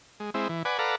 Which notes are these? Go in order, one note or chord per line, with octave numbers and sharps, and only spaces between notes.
G#3
G#3 C4 E4
E3
B4 D5 F#5 G#5
A4 B4 D5 F5 F#5 A#5